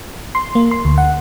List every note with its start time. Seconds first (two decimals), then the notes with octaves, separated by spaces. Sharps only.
0.35 C6
0.55 A#3
0.71 C6
0.85 D2
0.98 F#5